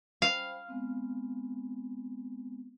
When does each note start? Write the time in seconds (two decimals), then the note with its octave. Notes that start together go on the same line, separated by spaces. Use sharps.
0.22 C5 F5 G5 B5
0.68 G#3 B3 C4